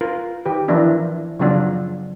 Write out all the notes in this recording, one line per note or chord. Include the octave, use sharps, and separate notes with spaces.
F4 A#4 B4
D#3 G4 B4
E3 F3 A#3 B3 D4 E4
C#3 F3 F#3 B3 D4 F4